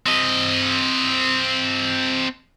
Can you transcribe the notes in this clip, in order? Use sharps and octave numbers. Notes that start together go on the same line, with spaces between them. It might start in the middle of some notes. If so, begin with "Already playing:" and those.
C4 D#5